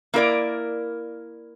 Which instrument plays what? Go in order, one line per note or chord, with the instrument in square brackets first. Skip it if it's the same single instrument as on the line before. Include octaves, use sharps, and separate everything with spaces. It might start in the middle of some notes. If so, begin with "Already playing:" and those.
[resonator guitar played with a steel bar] A#3 E4 A#4 D5